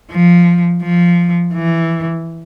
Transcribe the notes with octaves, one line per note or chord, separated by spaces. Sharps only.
F3
F3
E3